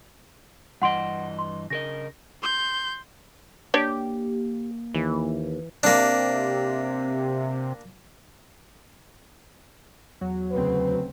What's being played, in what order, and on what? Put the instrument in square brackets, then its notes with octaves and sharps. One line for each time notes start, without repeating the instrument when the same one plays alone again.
[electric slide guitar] G2 E3 D#5 [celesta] F#5 C6 D7
[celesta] C6
[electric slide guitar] C#3 A#4 D#5 [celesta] A#6
[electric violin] C6 G6
[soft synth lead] A#3 [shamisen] D4 C#5 D5 [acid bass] G4
[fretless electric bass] D#2 [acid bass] E3
[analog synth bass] C3 [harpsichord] A#3 D4
[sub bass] E2 [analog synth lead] F#3
[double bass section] D2 C#3 C4 [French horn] B4